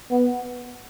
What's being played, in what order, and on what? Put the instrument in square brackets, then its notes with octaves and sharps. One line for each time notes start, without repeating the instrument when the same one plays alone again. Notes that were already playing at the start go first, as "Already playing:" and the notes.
[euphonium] B3